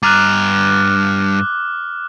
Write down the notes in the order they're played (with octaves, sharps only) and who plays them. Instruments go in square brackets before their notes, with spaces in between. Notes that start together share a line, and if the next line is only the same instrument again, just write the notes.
[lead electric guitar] G2 A#5 [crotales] D6 F6 F#6